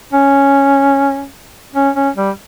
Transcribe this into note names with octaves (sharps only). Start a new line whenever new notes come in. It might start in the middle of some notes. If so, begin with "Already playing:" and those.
C#4
C#4
C#4
G3